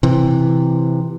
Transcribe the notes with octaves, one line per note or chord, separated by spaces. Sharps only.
C3 E3